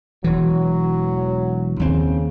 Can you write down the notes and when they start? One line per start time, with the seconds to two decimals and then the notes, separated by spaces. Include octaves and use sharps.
0.24 E1 E3 F#3
1.80 D#2 C#3 C4